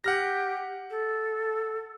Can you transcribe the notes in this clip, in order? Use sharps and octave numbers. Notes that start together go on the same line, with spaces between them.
G4 F#5 F6 A#6
A4